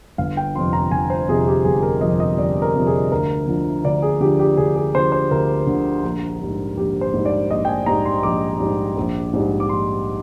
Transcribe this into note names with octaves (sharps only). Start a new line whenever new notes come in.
G1 F5
G5
F2 C3 F3 C6
A#5
G1 G#5
C5
F2 C3 F3 G#4
G4
G1 G#4
A#4
F2 C3 F3 D#5
D#5
G1 D5
A#4
F2 C3 F3
G#4
D2 A#4
D3 F3
D2 D5
G#4
D3 F3 G4
G4
D2 G#4
G#4
D3 F3 C5
C5
D2 A#4
D3 F3
A#1
G#2 G3
A#1 G4
C5
G#2 G3
D5
A#1 D#5
G5
G#5
G#2 G3 A#5
C6
A#1 D6
G#2 G3
A#1
G#2 G3
D6
A#1 C6